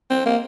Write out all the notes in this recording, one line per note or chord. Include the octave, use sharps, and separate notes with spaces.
C4
A#3